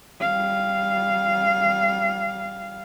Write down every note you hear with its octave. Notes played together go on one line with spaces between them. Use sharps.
G3 F5